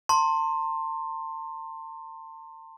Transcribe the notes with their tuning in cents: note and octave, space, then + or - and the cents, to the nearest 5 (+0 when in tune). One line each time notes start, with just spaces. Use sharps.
A5 +40 C6 +15